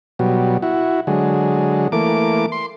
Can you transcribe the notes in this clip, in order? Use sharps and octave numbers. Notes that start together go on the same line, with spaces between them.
B2 F#3 G3
E4 F#4
D3 F#3 G#3
E3 A3 A#3 D6
C6